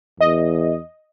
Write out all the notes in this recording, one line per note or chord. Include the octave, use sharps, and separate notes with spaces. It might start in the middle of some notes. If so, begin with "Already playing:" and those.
E2 D#5